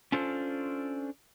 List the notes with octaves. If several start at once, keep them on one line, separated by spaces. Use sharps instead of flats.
C#4 D4 F4 A4 C5